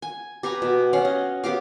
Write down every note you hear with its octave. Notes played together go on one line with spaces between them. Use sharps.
G#5
G4 B4 G#5 A#5
B2
C#4 F5 F#5
D#5
B3 G4 F5 D6